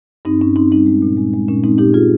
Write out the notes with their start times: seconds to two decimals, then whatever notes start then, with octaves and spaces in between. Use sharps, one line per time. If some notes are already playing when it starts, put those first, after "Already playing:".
0.25 G2 C4 D#4
0.40 G2 C#4
0.56 G2 C4 D#4
0.71 G3 C4 D#4
0.86 G#3
1.02 A#2
1.17 G#3
1.33 G#3
1.48 A#2 C#4
1.64 G#3 C4 D#4
1.78 A#2 D#4 G4
1.94 A#2 F4 G#4